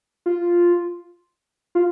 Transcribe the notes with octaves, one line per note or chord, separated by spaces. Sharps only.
F4
F4